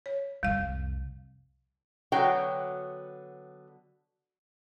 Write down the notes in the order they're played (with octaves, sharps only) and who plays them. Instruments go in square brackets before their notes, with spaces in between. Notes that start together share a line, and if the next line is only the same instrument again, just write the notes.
[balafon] C#5
[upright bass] C2 F2 [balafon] G3 F5
[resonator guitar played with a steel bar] D3 F#3 B3 F#4 C#5 G5